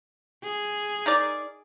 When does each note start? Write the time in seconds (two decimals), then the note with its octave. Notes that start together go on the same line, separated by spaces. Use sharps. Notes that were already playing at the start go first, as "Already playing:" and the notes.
0.43 G#4
1.06 D#4 A#4 D5